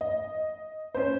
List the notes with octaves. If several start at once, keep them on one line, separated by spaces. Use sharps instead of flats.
D#5
C#4 C5